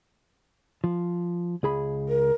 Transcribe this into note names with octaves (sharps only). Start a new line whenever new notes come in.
F3
C#2 G#4 B5
A#4